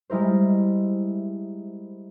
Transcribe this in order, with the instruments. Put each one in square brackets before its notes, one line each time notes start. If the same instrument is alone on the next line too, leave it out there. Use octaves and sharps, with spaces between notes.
[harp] G3 G#3 E4 A#4 C5